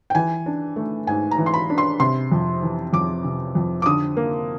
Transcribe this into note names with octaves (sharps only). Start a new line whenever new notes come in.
G5
E3 G#5
D4
A3
G#2 G#5
A#5
E3
C6
B5
D4
C6
C3 C6
F2
E3
F2 D6
C3
F2
D6
D3 D#6
A#3